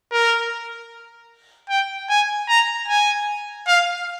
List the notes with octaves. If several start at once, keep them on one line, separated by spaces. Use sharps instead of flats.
A#4
G5
G#5
A#5
G#5
F5